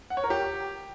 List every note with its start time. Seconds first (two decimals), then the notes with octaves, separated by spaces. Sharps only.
0.10 F#5
0.17 C#5
0.24 A#4
0.30 G4